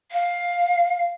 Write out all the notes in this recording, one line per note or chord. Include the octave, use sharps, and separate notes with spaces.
F5